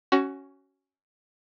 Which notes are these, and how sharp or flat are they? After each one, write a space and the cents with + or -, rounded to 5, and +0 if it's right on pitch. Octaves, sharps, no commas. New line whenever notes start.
C#4 +0 F#4 +20